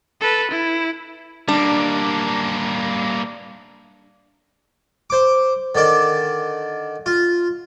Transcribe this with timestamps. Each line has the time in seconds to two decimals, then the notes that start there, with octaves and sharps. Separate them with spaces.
0.21 A4 B4
0.52 E4
1.48 G3 A#3 D4
5.10 C5 D6
5.75 D3 D#3 D5
7.06 F4